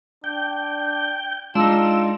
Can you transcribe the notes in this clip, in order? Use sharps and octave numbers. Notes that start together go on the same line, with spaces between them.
D4 G5
G#3 D4 D#4 F4 E6